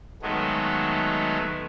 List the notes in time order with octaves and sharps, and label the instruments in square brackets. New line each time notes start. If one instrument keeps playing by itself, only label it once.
[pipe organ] D#3 F#3 G#3 A3 B3